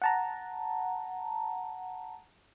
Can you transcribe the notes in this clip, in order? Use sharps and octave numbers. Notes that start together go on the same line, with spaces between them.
F#5 A5 A#5